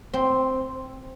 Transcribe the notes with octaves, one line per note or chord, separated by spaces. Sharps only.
C4